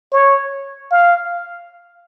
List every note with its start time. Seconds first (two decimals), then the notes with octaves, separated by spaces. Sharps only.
0.12 C#5
0.91 F5